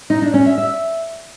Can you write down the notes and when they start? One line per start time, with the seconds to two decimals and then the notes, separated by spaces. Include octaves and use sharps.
0.10 D#4
0.22 D4
0.34 C#4
0.46 E5
0.58 E5